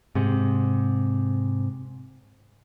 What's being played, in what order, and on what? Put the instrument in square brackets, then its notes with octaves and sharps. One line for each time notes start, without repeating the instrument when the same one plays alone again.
[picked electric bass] G#2 C3